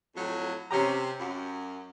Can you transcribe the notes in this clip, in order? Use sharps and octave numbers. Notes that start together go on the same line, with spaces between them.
F2 A2 F#3
C3 C#4 G4 A#5
F#2